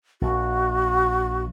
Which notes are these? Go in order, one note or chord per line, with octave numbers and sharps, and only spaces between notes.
A#1 F#4